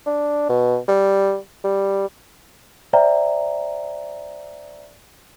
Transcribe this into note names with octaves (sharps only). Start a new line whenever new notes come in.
D4
B2
G3
G3
C5 D5 E5 G5 A#5